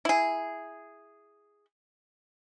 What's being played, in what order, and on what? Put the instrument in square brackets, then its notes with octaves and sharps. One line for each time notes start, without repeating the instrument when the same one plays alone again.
[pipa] E4 G#4